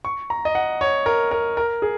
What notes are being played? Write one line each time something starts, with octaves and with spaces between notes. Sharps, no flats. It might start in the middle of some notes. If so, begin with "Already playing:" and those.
C#6
A#5
D#5
F#5
C#5
A#4
A#4
A#4
G#4